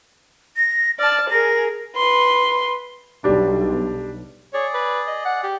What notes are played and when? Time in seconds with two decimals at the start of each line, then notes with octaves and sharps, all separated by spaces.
0.57 A#6
0.99 D5 A5 F6
1.30 G#4 A#4 A#6
1.96 B4 C6
3.24 B1 G3 D4
4.54 G#4 C#5 D5
4.74 B4
5.07 D#5
5.25 F#5
5.43 G4